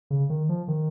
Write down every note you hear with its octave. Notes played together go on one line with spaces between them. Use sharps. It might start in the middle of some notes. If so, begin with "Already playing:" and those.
C#3
D#3
F3
D#3